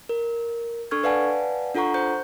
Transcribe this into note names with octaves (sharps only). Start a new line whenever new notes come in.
A#4
D4 A4 C#6 F6 G#6
B4 D5 F5 F#5 G#5 A5
D4 F4 A4 F#5 A#5 C#6
C5 G6